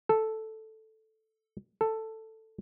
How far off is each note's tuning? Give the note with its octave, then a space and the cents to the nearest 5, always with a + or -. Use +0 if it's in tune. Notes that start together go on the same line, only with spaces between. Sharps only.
A4 +0
A4 +10